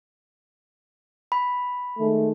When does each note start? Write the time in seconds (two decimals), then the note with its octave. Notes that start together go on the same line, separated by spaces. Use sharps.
1.32 B5
1.98 D#3 G#3 A3